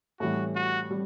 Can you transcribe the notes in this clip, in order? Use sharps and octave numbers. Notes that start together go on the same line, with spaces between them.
A2 E3 G3 F#4
F#4
G3